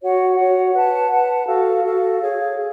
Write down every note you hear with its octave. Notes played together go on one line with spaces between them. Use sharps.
F#4 C#5 F#5
F#4 C#5 F#5
B4 F#5 A5
B4 F#5 A5
F#4 A4 F5
F#4 A4 F5
G#4 C#5 F5
G#4